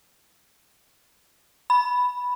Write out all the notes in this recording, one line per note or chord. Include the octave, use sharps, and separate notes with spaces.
B5